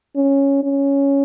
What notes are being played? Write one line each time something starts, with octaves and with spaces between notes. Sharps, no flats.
C#4
C#4